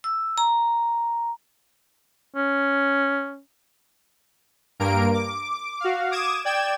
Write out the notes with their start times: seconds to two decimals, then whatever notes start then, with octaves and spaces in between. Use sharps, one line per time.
0.04 E6
0.38 A#5
2.36 C#4
4.80 G2 A#3 A#4 D7
5.14 D6
5.80 F#4 F5
6.11 D6 D#6 G#6 E7
6.45 D5 G5 G#6 E7